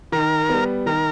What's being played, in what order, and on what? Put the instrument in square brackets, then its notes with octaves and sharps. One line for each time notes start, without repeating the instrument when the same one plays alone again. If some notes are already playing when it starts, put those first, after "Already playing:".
[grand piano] D#3 [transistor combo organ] A#4
[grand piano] G3 B3
[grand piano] D#3 [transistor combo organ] A#4